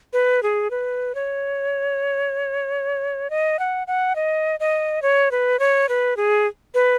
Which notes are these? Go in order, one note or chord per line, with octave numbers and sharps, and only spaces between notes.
B4
G#4
B4
C#5
D#5
F#5
F#5
D#5
D#5
C#5
B4
C#5
B4
G#4
B4